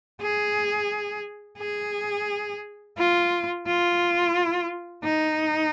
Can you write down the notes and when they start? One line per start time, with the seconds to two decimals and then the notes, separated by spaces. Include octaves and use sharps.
0.21 G#4
1.59 G#4
2.97 F4
3.66 F4
5.04 D#4